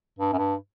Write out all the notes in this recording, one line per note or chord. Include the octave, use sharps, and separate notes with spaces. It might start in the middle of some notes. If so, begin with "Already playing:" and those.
G2
F#2
G2